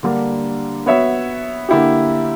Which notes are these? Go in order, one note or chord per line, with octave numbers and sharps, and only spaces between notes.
D3 G3 A#3 D4
B3 F#4 C#5 E5
D3 A#3 E4 G4